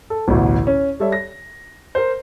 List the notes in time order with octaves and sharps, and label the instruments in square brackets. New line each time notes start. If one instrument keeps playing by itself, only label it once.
[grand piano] A4
A1 D2 B2
C#4
G3 A4 C#5 E5
A#6
A#4 C5